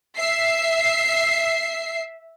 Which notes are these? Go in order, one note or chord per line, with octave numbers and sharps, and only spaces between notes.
E5 C7